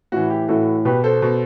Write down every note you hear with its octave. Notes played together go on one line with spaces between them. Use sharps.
A2 E3 F#4
G4
A2 E3 F#4 A4
B2 G4 B4
A4 C5
B2